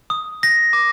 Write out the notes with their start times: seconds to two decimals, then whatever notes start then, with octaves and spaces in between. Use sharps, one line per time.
0.10 D#6
0.43 A#6
0.73 D6